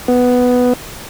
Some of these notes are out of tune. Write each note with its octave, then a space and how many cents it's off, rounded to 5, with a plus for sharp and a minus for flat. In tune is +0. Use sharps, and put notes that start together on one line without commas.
B3 +5